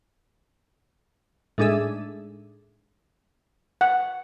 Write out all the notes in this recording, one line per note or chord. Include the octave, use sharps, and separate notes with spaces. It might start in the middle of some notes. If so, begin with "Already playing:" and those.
A2 G#3 D4 D#4 G#4 E5
F#5